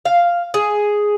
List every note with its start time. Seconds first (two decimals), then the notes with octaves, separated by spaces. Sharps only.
0.05 F5
0.54 G#4